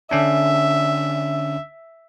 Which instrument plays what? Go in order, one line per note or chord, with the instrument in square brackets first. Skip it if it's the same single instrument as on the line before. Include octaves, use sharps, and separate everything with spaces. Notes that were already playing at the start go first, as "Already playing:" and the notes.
[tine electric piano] D3 C#4 D4 [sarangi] E5